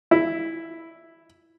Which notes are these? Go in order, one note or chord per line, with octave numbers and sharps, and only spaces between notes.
E4